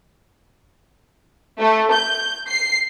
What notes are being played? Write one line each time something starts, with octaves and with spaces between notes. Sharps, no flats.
A3
G6
C7